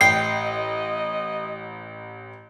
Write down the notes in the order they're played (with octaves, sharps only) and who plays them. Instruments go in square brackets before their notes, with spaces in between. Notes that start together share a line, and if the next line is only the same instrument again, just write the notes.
[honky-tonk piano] A1 [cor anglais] D#5 [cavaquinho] G5 [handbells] C7